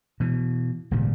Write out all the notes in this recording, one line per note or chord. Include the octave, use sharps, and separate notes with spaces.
B2 E3
G#1 A#2 C#3 G3